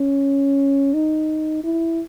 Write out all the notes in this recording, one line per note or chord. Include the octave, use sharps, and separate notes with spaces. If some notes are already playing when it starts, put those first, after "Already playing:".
Already playing: C#4
D#4
E4